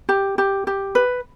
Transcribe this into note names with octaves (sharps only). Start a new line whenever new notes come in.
G4
G4
G4
B4